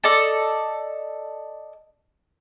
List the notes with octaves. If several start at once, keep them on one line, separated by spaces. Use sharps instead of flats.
A4 D5 D#5 A5